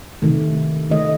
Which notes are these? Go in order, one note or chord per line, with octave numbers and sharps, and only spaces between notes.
C3 D#3 A3
D#3 A3 D#5